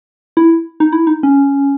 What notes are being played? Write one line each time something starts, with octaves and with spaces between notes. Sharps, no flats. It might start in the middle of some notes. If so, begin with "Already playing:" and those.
E4
D#4
E4
D#4
C#4